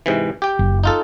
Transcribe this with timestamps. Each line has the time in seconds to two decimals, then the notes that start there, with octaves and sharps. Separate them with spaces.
0.06 G#2 C3 E3
0.42 G4 G5
0.59 F#1
0.84 D#4 F4 A4